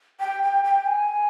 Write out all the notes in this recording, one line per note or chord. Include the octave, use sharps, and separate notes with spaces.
G5
G5
G5
G#5